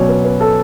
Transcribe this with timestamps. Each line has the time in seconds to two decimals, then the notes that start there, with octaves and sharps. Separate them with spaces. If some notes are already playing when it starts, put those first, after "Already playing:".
Already playing: B2 F#3 C#4 C#5 D5
0.09 B4
0.25 B4
0.41 A4